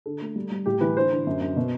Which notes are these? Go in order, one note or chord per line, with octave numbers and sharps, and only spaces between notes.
D3 A4
A3
G3
G3
A2 G4
E3 B4
D3 C5
D3
F#2
F#2
B2